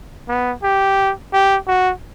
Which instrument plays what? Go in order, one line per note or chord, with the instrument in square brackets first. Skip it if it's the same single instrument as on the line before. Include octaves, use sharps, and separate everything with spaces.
[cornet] B3
G4
G4
F#4